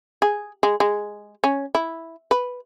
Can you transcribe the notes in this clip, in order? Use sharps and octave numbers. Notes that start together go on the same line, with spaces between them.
G#4
G#3
G#3
C#4
E4
B4